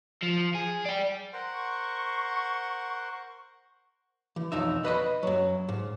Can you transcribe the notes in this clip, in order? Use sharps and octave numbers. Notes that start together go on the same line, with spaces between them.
F3
G#4
D5 G5
A#4 C5 F#5 C6
C#6
E3
B1 F2 D#4 E5
B4 D#5 B5
F#2 F#3
G#2